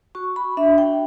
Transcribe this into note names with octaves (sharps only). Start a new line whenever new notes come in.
F#4 C#6
B5
D4 E5
G5